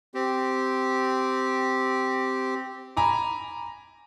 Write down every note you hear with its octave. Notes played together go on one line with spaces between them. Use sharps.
C4 G4
G#5 A#5 B5 D6